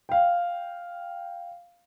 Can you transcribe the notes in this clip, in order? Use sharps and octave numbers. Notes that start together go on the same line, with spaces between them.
F5 G5